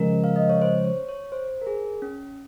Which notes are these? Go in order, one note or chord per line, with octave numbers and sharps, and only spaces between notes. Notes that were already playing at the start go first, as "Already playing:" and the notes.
Already playing: C#3 F3 G#3 C#4 A#4
F5
D#5
C#5
C5
C#5
C#5
C5
A#4
G#4
C#4